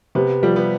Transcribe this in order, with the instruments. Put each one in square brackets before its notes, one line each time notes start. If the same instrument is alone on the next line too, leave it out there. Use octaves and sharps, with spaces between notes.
[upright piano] C3 [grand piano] B3
[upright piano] F3 [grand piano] G3
[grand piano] B3